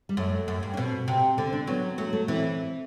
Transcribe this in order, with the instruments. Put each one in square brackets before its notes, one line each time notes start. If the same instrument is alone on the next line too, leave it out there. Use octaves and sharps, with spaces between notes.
[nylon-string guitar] G3
[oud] F#2 [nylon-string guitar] A3
[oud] F#2
G2
[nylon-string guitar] D4
[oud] B2 [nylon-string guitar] C4
[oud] C3
[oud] D3 [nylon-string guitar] C4
[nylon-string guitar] D4
[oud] F#3 [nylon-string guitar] B3
[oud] F#3 [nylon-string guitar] A3
[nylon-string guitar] A3
[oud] E3 [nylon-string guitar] C4